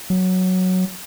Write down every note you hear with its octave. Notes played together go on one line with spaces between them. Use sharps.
F#3